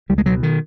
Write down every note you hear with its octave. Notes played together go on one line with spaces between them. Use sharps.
C#2 G3
G#3
B2 F#3
D#3